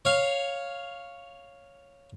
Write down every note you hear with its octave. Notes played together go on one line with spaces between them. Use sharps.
C#5 F5